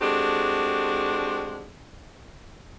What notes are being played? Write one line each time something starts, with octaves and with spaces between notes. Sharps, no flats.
G#3 C4 D4 F#4 G4 A4